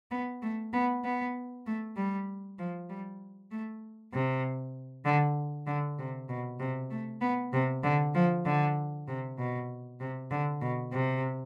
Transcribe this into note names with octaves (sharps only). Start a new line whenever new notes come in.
B3
A3
B3
B3
A3
G3
F3
G3
A3
C3
D3
D3
C3
B2
C3
A3
B3
C3
D3
F3
D3
C3
B2
C3
D3
B2
C3